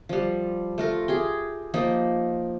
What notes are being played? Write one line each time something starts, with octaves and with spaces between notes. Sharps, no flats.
F3 G3
A3 F4 A#4
G4 G#4 G5
F3 A#3 D#4